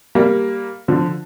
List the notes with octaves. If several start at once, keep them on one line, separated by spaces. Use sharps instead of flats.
G3 A#3
D3 F3